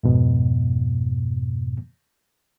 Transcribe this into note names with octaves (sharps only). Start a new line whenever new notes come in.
F2 G#2 B2